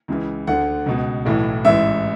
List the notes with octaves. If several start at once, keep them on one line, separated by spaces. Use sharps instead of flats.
C#2 C#3 E3
D2 D3 F#5
C#2 B2
B1 A2 E3
A1 G#2 E3 E5